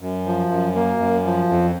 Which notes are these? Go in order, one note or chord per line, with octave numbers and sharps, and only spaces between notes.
F#2
F3
F#2
A#3
F#2
F3
F2